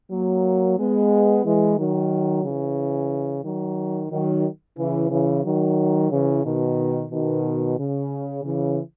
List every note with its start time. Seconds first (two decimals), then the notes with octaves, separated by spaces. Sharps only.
0.11 F#3 A#3
0.78 G#3 B3
1.45 E3 G#3
1.78 D#3 F#3
2.44 C#3 E3
3.44 D#3 F#3
4.11 D#3 F#3
4.77 C#3 E3
5.11 C#3 E3
5.44 D#3 F#3
6.11 C#3 E3
6.44 B2 D#3
7.10 B2 D#3
7.77 C#3
8.44 C#3 E3